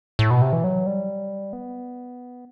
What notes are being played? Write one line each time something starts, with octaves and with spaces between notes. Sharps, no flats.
A2
B2
C3
E3
F#3
G3
B3